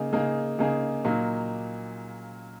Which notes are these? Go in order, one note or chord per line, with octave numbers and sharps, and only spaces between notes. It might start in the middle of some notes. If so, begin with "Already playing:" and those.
Already playing: C#3 A#3 D#4 G#4
C#3 A#3 D#4 G#4
C#3 A#3 D#4 G#4
A#2 F#3 A#3 D#4